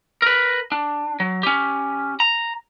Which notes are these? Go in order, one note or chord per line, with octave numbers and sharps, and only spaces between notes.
A#4 B4
D4
F#3
C#4 G4
A#5